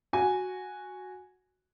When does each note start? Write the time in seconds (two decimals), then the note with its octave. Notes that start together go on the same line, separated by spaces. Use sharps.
0.13 F#4 G#5